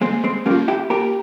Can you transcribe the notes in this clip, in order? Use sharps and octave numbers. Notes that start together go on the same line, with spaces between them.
G#3 A#3 C4
G#3 C4
G3 A#3 C#4 F4
E4 G4
A#3 G4 A#4